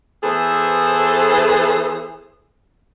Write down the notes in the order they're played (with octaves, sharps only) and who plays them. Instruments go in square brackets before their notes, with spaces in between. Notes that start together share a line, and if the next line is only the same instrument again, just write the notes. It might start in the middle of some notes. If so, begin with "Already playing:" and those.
[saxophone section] E3 B3 G#4 A4 C5